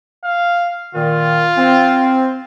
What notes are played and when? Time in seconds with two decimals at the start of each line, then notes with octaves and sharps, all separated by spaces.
0.24 F5
0.95 A#2 D#3 F4
1.57 C4